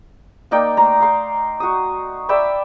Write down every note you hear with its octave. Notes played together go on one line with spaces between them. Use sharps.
A#3 D#4 D5 G5
A3 A#5 C6
F5 C6
F#4 D#6
D5 E5 G5 B5